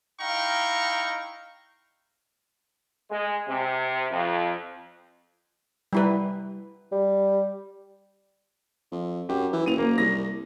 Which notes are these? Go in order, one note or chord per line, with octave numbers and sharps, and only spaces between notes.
D#4 E4 F5 G5 A#5 C#6
G#3
C3
F2
G3 E4 B4
G3
F2
F#2 G4
E3
F#1 D#7 F7
A#3
C2 A#6